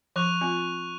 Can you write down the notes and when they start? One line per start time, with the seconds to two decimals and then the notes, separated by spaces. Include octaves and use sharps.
0.16 F3 C#6 F#6 F7
0.41 C4 F4